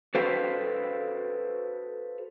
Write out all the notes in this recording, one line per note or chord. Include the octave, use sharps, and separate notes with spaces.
F#4 A4 B4 C5 F5